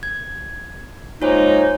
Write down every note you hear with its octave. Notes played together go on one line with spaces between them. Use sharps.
G#6
G#3 A#3 D#4 F4 C5 C#5